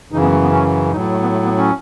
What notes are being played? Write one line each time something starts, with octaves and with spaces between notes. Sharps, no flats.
F#2 C#3 E3 D#4
B3
A3
B3
C#4
A2 F#3 D#4
A3
B3
A3
B3
C#4